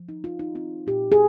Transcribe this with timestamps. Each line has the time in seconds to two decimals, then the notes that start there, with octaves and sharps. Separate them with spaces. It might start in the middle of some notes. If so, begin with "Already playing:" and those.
Already playing: F3
0.09 D#4
0.24 D#4 F4
0.39 D#4
0.55 C4 F4
0.87 A#2 G4
1.12 G#4